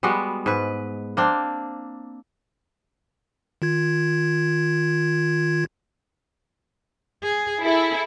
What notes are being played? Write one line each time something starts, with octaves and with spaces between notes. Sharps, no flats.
G3 G#3 B3 F#4
G#2 B4
A#3 C4 D4
D#3 F4 G#6
G#4
E4 G#4 A4